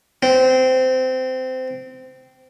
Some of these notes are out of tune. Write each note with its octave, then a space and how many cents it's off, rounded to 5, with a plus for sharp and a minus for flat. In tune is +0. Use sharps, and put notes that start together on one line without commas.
C4 -20